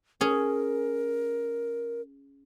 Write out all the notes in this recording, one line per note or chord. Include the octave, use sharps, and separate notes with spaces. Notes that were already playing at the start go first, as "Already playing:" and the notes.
C#4 G#4 A#4